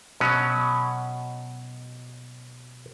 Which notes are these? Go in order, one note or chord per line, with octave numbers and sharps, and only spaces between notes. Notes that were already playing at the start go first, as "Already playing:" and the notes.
B2 F#3 C#4